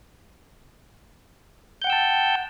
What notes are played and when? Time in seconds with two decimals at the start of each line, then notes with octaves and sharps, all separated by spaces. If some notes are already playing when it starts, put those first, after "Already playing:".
1.82 G6
1.84 F#5
1.87 G5
1.90 E6
1.92 A5